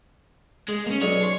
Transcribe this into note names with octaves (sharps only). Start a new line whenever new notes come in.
G#3 G#4
A#3 C#4
B1 G#4 C#5 D5 F7
A5 C6 C#6